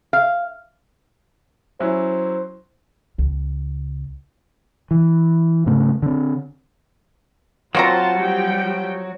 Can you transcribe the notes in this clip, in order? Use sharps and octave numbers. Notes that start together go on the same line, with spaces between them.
F5
F#3 C#4 E4 C5
C#2
E3
G#2 C#3 A3
D3 C4
F#3 A#3 C4 F4 F#4 C5 A5 A#5
F3 G3 G5